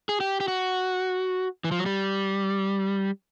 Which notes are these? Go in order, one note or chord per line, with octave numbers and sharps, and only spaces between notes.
G#4
G4
G4
F#4
E3
F3
F#3
G3